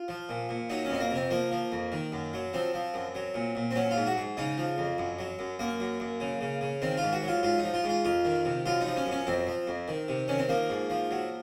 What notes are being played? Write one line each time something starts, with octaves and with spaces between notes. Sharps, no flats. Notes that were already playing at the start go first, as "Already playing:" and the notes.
Already playing: F4
F3
A#2
A#2
F#3 D#4
C#4
F2 C4
A#3
C3 C4
F3 A#3
F3
F2
D#3
F#2
F#3
F3 C4
F3
F#2
F#3
A#2
A#2
C4
F#3 C#4
F4
G#2
F#4
G#2
C#3 D#4
F3
F2
F#2
F#3
F#2
F#2 A#3
F#2
F#2
C#3
C#3
C#3
D#3 C4
F4
G#2
F#4
F#3
F4
G#2 F4
D#4
F3
F4
G#2
F4
F2 F4
D#3
C3
F#2 F4
D#4
F3
C#4
F#2
C#4
F2 C4
F3
F2
D#3
C3
D#3 C#4
C4
F3 A#3
G#2
F3
F#3